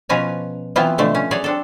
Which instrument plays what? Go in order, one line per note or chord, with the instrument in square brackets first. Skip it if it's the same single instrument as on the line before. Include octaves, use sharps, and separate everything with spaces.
[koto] B2 F3 C#4 B4 G#5 A#5
E3 F#3 B3 C4 E4 F4
B2 D3 F3 A3
C#4
F#3 G#4 C#5 D5
C4 D4 A4